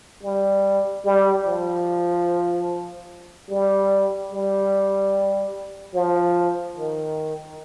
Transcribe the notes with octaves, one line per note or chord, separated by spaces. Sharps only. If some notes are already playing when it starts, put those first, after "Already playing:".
G3
G3
F3
G3
G3
F3
D#3